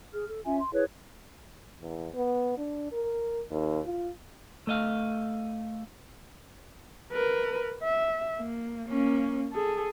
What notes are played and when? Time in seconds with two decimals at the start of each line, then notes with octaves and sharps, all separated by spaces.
0.13 G#4 F6
0.28 A4
0.45 C#4 F4 E5 G#5
0.60 C6
0.73 E4 G#4 B4 C#5
1.80 E2
2.14 B3
2.58 D4
2.92 A#4
3.51 D#2
3.85 F4
4.67 A3 D#5 F5
7.12 A#4 B4
7.83 E5
8.37 A#3
8.88 A#3 C#4
9.52 G#4 A4